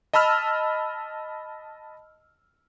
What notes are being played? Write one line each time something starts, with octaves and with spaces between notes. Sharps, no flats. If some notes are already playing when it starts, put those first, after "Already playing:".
D#5 A5 B5 E6 F6